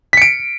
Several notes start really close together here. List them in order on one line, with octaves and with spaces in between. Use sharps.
B6 C#7 D7